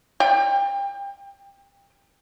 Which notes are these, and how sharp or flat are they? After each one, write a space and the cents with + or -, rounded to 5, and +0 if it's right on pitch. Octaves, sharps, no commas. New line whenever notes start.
G5 +30